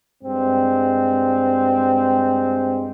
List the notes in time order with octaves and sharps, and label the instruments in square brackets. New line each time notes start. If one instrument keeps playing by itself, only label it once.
[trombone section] G2 G#3 C4